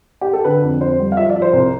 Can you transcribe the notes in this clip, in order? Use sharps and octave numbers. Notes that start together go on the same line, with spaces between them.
G4
A4
D3 B4
F2
F2 C5
G3
F5
F3 E5
D5
F3
C5
C2